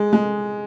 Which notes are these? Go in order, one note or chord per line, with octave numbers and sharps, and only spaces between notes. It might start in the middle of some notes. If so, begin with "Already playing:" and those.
Already playing: G#3
G#3